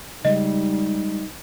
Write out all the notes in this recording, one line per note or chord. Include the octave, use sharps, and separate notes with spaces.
C#3 G3 G#3 D#4 D#5